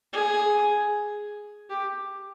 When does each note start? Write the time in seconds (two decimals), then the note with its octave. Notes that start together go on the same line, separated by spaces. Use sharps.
0.13 G#4
1.70 G4